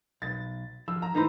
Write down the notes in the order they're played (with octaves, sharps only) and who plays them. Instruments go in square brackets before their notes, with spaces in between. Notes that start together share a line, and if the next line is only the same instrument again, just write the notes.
[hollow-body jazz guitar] B1 [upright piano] A6
[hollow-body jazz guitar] F3 [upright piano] E6
[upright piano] A#5
[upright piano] A2 B5 [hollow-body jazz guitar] E3 D#4 C5